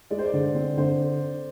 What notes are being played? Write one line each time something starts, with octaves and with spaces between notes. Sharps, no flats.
G#3 D5
C5
D5
D3
C4
D3 C5